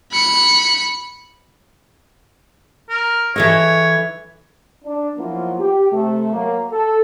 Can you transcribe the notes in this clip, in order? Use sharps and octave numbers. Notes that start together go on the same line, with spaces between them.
B5 C#7
A#4
E3 A4 C#5 D#5
D4
F3 F#3 A#3 B3 E4 F4
G4
C3 A3
F#3 A#3
A4